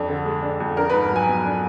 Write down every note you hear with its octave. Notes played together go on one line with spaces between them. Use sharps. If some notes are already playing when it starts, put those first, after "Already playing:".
Already playing: F2 D4
D3
G#3
D4
F2
D4 A#4
G#2 B4
F#3 G#5
B3
D4